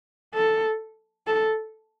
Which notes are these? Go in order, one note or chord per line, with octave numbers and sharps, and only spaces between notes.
A4
A4